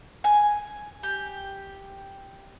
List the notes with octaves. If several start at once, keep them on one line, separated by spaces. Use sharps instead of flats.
G#5
G4